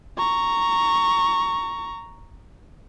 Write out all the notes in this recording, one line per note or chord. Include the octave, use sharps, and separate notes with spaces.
A#5 C#6